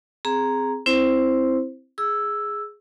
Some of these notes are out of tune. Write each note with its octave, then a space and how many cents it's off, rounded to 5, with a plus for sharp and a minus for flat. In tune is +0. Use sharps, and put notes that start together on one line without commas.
C4 -5 G#4 +0 A#5 +0
C4 +0 E4 +0 C5 +0
G#4 +0 E6 +0